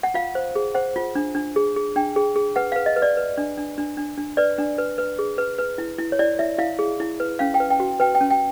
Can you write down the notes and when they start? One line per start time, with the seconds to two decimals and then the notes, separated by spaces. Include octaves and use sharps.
0.03 F#5
0.14 F4 F5
0.35 C5
0.56 G#4
0.74 C5 F#5
0.96 F4
1.15 D4
1.35 D4
1.56 G#4
1.76 G#4
1.96 D4 G5
2.16 G#4
2.36 G#4
2.56 B4 F#5
2.72 B4 F5
2.86 D#5
2.96 B4
3.02 D5
3.17 B4
3.38 D4
3.58 D4
3.78 D4
3.97 D4
4.18 D4
4.37 B4 D5
4.58 D4
4.78 B4
4.98 B4
5.19 G#4
5.38 B4
5.59 B4
5.78 E4
5.98 E4
6.12 C#5
6.19 E4 D5
6.39 E4 E5
6.59 E4 F5
6.79 G#4
7.00 E4
7.20 B4
7.39 C#4 F5
7.54 G5
7.60 B4
7.70 G5
7.80 F#4
8.00 B4 G5
8.15 G5
8.21 C#4
8.31 G5